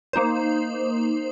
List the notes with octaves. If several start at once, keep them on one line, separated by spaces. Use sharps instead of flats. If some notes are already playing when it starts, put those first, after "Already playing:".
A#3 D#4 C5